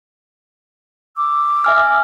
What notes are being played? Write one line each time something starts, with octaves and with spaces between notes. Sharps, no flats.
D6 E6
E5 G#5 F6